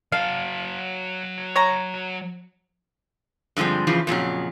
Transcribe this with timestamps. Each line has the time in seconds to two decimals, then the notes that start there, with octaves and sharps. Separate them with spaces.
0.12 F#3 F5 A5
1.56 C#5 A#5
3.57 G2 D3 F3 G#3 C4
3.87 C#3 E3 F3
4.07 F2 A#2 C#3 F#3